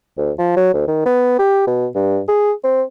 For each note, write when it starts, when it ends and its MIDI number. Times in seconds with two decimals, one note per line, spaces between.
0.17 0.32 38
0.39 0.52 53
0.56 0.73 54
0.74 0.84 38
0.88 1.02 51
1.06 1.37 59
1.39 1.65 67
1.67 1.88 47
1.95 2.20 43
2.28 2.52 68
2.64 2.83 60